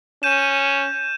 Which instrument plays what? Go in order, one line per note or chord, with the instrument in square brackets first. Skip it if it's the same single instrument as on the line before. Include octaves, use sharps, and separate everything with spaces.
[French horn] C#4 [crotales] G6 D#7 E7